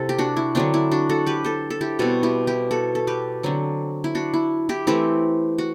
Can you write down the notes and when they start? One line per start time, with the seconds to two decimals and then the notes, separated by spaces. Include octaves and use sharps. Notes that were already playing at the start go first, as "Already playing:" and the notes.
Already playing: C3 E4 A4
0.09 G4
0.18 D4 F#4
0.37 E4
0.55 D3 F#3 C4 D4
0.74 E4
0.91 D4 F#4
1.09 F#4 A4
1.26 G4 B4
1.44 A4 C5
1.70 A4
1.81 E4 G4
1.99 B2 G3 C4 F#4 A4
2.23 E4 G4
2.47 E4 G4
2.71 F#4 A4
2.95 A4
3.07 G4 B4
3.43 D3 F#3 C4
4.04 E4
4.15 D4 F#4
4.34 E4
4.69 E4 G4
4.87 E3 A3 C4 E4 G4
5.58 F#4